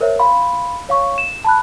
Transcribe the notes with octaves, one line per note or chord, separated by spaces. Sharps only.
A#4 C5 C#5 E5
F5 B5 C6
C#5 F5 C#6
E7
A5 B5 F#6